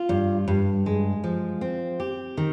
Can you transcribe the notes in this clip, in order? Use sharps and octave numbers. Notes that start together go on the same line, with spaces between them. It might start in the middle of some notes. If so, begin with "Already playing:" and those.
Already playing: F4
G2
G2
G#3
F3
C4
G4
D#3